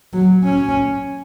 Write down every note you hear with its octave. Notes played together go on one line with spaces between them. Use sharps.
F#3
C#4